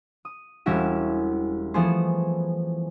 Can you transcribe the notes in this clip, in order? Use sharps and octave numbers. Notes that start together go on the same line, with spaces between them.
D#6
E1 G3 C#4 E4 F#4 E7
E3 F3 A3 B3 G#4 C5